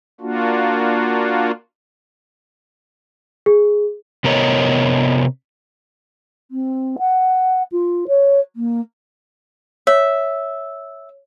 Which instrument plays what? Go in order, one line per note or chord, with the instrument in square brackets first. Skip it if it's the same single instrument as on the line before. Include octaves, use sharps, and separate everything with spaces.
[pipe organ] A#3 D4 F4 F#4
[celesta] G#4
[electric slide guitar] C3 B3 A#4 C#5 D#5
[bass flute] C4
F#5
F4
C#5
A#3
[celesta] C#5 [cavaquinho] E5